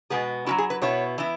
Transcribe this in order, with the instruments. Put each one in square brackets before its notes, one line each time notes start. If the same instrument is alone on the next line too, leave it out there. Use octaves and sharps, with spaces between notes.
[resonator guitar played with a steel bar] B2 G#3 B3 G#4
F#3 C#4 E4 F#4
G#4
B4
B2 B3 E4 C#5
E3 B3 E4